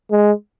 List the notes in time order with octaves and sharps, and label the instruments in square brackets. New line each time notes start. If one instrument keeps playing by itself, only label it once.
[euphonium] G#3